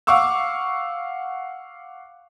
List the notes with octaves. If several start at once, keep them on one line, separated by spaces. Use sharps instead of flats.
F5 F#5 C#6 D6 E6